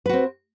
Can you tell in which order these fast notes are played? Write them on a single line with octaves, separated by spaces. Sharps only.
B4 F#4 C4